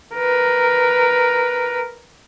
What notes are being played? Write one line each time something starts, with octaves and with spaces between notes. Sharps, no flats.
A#4 B4